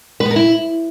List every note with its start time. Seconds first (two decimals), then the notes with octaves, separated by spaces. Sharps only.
0.20 B4
0.25 B3
0.31 A#4
0.36 E4